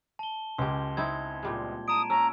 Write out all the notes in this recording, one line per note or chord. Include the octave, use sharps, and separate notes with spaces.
A5 G7
C#2 C#4 G4 C6
C4 D#4 E4 G#6
A#2 G3 G#3
A5 A#5 D#6 D7
C#4 A#5 E6